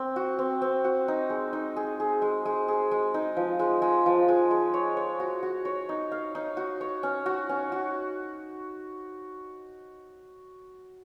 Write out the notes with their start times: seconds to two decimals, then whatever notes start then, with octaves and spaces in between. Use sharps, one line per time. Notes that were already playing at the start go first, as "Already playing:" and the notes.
Already playing: C4
0.16 F#4
0.39 C4
0.62 C4
0.84 F#4
1.08 D#4
1.30 G#3
1.53 D#4
1.76 G#4
2.00 G#4
2.22 G#3
2.45 G#3
2.68 G#4
2.91 G#3
3.14 D#4
3.37 F3
3.59 G#3
3.82 G#3
4.06 F3
4.28 G#3
4.51 G#3
4.74 C#5
4.97 C#5
5.20 F#4
5.43 F#4
5.65 C#5
5.89 D#4
6.12 F5
6.35 D#4
6.57 F#4
6.81 C#5
7.03 C#4
7.26 F#4
7.49 C#4
7.72 F#4